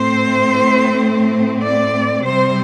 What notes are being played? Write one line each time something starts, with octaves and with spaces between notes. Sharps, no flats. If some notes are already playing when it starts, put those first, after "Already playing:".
Already playing: A2 A3 C4 C5
D5
C3 G3 C4 C5